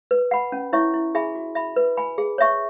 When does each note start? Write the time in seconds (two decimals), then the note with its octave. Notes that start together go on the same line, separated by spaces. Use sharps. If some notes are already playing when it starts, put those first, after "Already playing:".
0.11 B4
0.31 F#5 B5
0.52 C#4
0.73 E4 C#5 E5 C#6
0.94 E4
1.15 G#4 E5 G#5 B5
1.35 F#4
1.55 E5 B5
1.76 B4
1.97 G#5 B5
2.18 G#4
2.38 C#5 E5 C#6